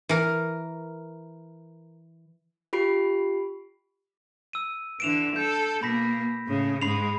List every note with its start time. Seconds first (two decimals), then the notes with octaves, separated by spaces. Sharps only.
0.09 E3 A#4
2.73 F4 G4 B5 C7 D7
4.53 E6 D#7
5.00 D3 E3 D7 E7 F7
5.36 A4 G6
5.83 B2 A#3 B5 A#6 B6
6.46 A2 C#3
6.82 G#2 G#3 B5 C7 F7